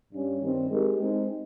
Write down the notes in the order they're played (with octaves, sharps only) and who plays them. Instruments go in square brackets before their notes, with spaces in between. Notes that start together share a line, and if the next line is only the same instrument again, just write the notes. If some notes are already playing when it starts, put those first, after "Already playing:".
[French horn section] G2 G3 C#4
G2 D#3 G3 C4
G#3 C4 D#4 G4 A#4
G#3 C4 D#4